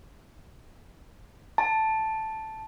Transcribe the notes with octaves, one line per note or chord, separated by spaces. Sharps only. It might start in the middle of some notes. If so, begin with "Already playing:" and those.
A5